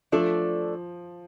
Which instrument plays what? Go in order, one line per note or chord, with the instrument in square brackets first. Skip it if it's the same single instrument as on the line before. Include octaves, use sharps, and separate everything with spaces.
[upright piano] F3 [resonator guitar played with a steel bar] A3 D4 A4 D5